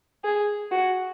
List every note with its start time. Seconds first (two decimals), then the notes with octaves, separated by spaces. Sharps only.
0.24 G#4
0.72 F#4